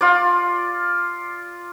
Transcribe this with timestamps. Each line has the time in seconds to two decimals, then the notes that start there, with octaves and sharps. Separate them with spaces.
0.01 F4 D5